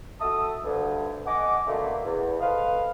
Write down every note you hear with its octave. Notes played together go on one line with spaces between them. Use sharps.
F#4 A4 E5 A5 D#6
D2 G2 D3
D#5 F#5 G#5 D6
B2 D3 A3 A#3
E2
A4 B4 C5 D#5 F5